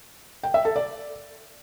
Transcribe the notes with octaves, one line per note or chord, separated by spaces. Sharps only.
G5
E5
A4
D5